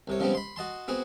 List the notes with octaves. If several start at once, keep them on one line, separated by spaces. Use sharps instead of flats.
C2 C3 C#5
C#3 F3 G3 G#3 B3 C4
B5 C6
F#4 D#5 A5 C6
B3 C4 F#4 G#4